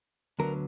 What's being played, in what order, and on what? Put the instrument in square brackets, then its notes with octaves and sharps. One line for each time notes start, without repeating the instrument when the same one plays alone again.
[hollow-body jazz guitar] D2 D3 F#3 B3 A#4